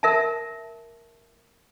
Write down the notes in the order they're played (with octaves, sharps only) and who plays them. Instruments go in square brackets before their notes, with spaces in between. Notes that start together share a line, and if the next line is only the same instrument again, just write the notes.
[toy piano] A#4 E5 A5